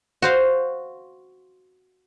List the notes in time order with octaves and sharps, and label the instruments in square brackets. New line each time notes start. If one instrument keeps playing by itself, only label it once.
[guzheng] F#4 C5 F5